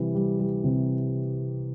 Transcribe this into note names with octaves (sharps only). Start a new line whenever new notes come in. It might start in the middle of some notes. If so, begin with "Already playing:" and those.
Already playing: C3 E3 G3
G3
G3
C3